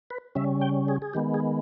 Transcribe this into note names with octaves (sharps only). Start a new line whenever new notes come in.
B4
C#3 G3 C#4 E5
G5
G#4
G#4
D#3 G#3 B3 G4
G#4